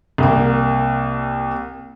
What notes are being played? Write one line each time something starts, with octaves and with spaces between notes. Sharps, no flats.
C2 A#3